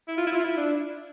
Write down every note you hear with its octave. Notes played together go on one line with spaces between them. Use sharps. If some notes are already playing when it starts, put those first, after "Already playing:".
E4
F4
E4
F4
E4
D4